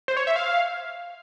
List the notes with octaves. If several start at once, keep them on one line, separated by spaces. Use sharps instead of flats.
C5
C#5
E5
F5